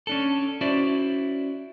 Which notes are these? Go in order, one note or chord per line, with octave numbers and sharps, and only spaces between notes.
C#4 D4 A4
C#4 E4 F#4 C5 D5